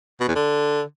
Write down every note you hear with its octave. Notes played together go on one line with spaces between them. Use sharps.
B2
E2
D3